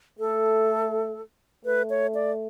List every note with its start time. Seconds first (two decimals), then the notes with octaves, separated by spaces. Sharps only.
0.19 A3 A4
1.65 A3 B4
1.90 C#5
2.15 D5